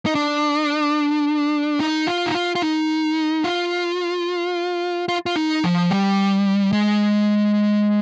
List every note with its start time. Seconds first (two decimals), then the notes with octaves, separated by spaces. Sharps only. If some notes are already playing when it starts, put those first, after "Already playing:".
0.06 D#4
0.15 D4
1.80 D#4
2.07 F4
2.26 D#4
2.34 F4
2.55 F4
2.62 D#4
3.44 F4
5.08 F4
5.26 F4
5.36 D#4
5.64 F3
5.91 G3
6.73 G#3